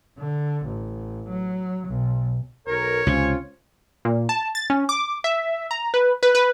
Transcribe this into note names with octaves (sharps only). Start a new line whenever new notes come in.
D3
A1
F#3
B1
B1 A#4 C#5
C#2 C3 C4 C#4 F4
A#2
A5
A6
C#4
D6
E5
A#5
B4
B4
B4